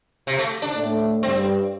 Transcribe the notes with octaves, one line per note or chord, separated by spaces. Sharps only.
C3
A3
D4
A2 A3
G2 G3 C4